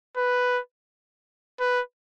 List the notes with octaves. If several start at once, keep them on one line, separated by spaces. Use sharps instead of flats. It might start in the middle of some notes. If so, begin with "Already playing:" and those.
B4
B4